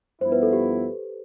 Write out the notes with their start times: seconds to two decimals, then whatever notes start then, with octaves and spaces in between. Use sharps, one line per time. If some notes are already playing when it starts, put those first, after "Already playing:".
0.21 G2 F3 B3 E4 C5
0.32 B4
0.42 A4
0.53 G4